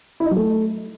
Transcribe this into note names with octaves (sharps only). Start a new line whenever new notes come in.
E4
D#4
F#3
A3